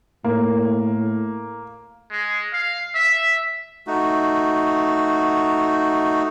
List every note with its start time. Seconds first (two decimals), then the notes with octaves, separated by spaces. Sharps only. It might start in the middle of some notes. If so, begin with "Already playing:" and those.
0.24 A2 A#3
2.11 G#3
2.54 F5
2.95 E5
3.87 A3 D#4 F#4